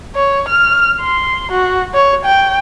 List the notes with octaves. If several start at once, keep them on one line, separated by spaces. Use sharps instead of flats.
C#5
F6
C6
F#4
C#5
G5